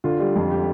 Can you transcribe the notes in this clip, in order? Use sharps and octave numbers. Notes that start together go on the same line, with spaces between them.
D3 F4
G3
F2
G4